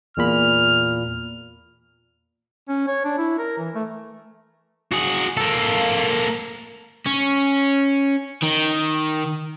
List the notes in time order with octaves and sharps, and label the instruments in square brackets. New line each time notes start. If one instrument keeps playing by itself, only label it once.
[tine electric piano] E2 A#2 B5 [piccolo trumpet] F6
[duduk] C#4
C#5
D4
E4
A#4
E3
A3
[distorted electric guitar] F#4 G#4
A#3 A4
[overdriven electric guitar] C#4
D#3